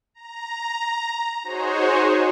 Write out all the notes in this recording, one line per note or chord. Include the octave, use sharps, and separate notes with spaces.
A#5
D#4 F#4 G#4 C5 C#5